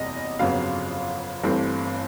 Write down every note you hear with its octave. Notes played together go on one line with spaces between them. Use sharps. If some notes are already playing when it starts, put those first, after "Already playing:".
Already playing: F#1 E2 C3 E3 G3 D#5
G1 F2 C#3 F#3 B3 F5
G1 G2 E3 A3 C4